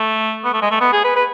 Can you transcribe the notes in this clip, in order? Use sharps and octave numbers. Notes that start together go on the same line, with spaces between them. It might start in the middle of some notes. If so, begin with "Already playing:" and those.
Already playing: A3
B3
A3
G#3
A3
B3
G#4
B4
B4